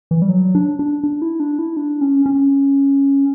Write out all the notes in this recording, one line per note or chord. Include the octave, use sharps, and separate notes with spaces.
E3
G3
F#3
D4
D4
D4
E4
D4
E4
D4
C#4
C#4